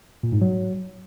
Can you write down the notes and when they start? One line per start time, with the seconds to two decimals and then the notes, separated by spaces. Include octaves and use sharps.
0.23 A#2
0.32 G#2
0.41 F#3